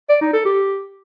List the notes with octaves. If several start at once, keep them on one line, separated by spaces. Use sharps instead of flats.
D5
D#4
A4
G4